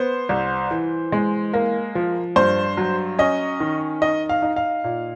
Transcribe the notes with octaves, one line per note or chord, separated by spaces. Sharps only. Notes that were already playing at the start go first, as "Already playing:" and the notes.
Already playing: B3 C5
C2
E3
G#3
A#3
F3
G2 C5
F#3
C#4 D#5
D#3
D#4 D#5
F5
D#4
F5
A#2